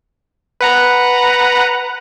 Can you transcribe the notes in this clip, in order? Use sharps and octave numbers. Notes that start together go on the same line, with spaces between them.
B4 F#5 A#5